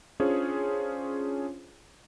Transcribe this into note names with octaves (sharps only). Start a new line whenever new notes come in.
C#4 D4 F4 G#4 C5 C#5